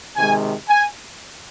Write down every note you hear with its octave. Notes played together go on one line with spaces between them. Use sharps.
C3 D#3 G#3 G#5
G#5